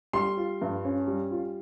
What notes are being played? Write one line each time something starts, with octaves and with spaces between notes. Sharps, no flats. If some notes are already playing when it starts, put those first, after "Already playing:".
G3 C6
F4
G2
C#4
G3
F4